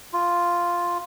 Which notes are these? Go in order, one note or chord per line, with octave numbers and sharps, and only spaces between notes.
F4